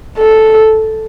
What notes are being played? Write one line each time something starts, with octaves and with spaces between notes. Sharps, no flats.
A4